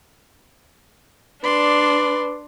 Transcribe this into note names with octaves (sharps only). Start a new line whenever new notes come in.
D4 B4 D5 C6